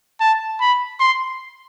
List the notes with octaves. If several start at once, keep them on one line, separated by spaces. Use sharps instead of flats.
A5
B5
C6